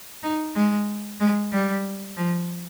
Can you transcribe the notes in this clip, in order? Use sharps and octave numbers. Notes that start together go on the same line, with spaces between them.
D#4
G#3
G#3
G3
F3